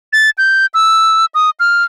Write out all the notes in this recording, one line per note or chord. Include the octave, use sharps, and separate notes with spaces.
A6
G6
E6
D#6
F6